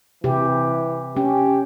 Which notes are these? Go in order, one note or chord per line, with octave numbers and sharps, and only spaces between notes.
C3 E3 G4
C#4 G4